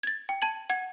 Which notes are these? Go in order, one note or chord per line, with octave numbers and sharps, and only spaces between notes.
G#6 A6
G5
A5 G#6 F#7
F#5 G#6